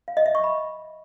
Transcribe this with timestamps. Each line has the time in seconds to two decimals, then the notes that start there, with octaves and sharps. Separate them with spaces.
0.08 F5
0.17 D#5
0.26 E5
0.35 C#6
0.44 B5